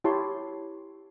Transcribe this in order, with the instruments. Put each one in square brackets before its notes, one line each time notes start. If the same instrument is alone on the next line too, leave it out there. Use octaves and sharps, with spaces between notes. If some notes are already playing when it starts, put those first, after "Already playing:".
[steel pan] E4 G4 C#5 A5 C6